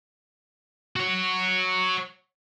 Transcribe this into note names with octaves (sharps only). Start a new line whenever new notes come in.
F#4 C#5